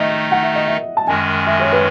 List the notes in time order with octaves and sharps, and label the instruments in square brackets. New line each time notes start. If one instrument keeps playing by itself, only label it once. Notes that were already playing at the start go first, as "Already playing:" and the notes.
Already playing: [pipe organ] D#3 A3 D#4 [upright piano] D#5 E5
[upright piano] F#5
E5
D#5
E5
A5
[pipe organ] F#2 D#3 G#3 [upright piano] G#5
[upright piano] E5
C#5
B4